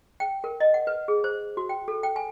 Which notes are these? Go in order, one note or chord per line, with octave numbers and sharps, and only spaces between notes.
G5
A#4
D#5
F#5
B4
G#4
C5
F#4
G5
A4
G5
G#5